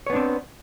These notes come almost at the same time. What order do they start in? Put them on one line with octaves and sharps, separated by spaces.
C#5 B3 D4 C4